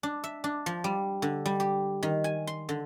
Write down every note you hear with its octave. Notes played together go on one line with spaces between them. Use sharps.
D4
E5
D4
F3
G3
D3
G3
G4
D#3
G#5
C6
D3